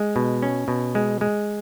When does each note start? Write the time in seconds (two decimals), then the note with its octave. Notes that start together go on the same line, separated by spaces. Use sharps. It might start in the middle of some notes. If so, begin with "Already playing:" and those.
Already playing: G#3
0.16 B2
0.43 C#4
0.68 B2
0.95 G#3
1.21 G#3